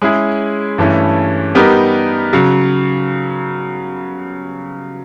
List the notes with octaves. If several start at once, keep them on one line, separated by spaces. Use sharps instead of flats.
G#3 C#4 E4 G#4
G2 E3 A3 C#4 E4
G3 B3 D#4 G4 A#4
C#3 F#3